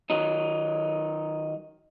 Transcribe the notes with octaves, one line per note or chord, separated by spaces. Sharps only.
D#3 F#3 D#4